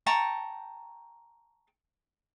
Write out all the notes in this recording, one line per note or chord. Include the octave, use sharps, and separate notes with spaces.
G5 A5 A#5 C#6